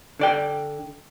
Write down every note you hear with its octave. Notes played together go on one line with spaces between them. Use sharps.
D3 D5 G5